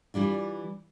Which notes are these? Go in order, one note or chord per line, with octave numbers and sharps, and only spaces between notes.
E3 G3 D4 F4